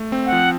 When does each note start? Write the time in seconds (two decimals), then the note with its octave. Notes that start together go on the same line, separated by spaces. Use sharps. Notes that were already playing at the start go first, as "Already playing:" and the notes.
Already playing: A3
0.12 C4
0.26 F#5
0.32 F3